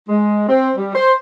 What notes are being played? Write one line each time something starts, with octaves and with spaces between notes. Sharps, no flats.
G#3
C4
G3
C5